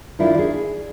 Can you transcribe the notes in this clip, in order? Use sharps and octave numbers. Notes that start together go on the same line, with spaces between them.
D#3 D4 E4 F4
G#4